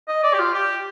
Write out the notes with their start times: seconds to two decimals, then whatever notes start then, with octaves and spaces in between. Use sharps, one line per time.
0.08 D#5
0.23 D5
0.34 G4
0.39 F4
0.54 G4